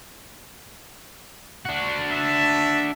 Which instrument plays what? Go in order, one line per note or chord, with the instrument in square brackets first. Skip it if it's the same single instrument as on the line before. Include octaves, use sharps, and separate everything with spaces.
[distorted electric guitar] D4 F#4
[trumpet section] E5 A5